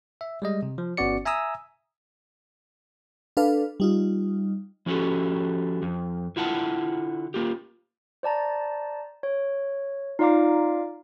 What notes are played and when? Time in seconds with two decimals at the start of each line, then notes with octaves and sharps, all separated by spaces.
0.21 E5
0.42 G3 G#3 D#5
0.62 C3
0.78 F3
0.97 G1 B3 C#4 F#4 D5 C#7
1.25 E5 G#5 A#5 D#6 E6
3.37 D4 A4 B4 F5
3.80 G3 D#4 F4
4.86 F3 C#4 F#4 G4 A4
5.82 F2
6.36 D3 E4 F4 F#5 G5 A5
7.34 A#3 F4 G4
8.23 C5 D5 A5 A#5
9.23 C#5
10.19 D#4 F4 D5 F5 A#5 D6